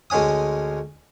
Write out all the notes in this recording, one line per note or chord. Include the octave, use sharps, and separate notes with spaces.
D2 G#3 C#4 G#5 D#6